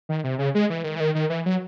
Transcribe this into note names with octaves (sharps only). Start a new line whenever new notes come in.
D#3
C3
C#3
G#3
E3
D#3
E3
D#3
D#3
E3
F#3